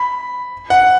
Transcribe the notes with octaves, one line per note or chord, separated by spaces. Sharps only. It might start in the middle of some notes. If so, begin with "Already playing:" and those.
Already playing: B5
F#5